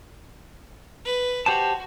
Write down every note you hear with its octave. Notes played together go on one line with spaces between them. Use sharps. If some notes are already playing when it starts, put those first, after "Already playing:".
B4
F#4 G4 C5 A5